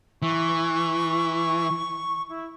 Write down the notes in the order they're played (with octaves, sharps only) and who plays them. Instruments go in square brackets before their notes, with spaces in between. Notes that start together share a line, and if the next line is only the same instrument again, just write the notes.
[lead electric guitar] E3 [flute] C#6
[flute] E4